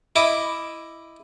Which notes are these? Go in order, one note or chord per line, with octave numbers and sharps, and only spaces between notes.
E4 D#5 D6